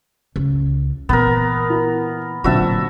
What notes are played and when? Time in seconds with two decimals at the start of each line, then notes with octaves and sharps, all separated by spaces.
0.36 C#2
1.09 A#2 E3 B3 A#4
1.70 E4
2.44 A1 A#2 D3 F#3 C4 F#4 E5 A5